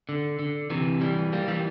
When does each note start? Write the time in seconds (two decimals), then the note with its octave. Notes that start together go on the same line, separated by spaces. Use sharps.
0.09 D3
0.39 D3
0.70 C3 E3
1.01 E3 G3
1.33 G3 A#3
1.48 E3 G3